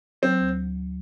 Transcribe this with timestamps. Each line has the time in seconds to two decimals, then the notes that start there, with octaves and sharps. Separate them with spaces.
0.22 F#3 C4
0.40 D2